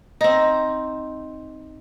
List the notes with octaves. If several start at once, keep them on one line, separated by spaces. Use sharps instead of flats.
C4 D#4